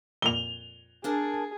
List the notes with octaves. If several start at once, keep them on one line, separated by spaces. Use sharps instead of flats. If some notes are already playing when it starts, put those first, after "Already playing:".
F2 A#2 A#3 F7 G7
D4 G#4 A#4 A5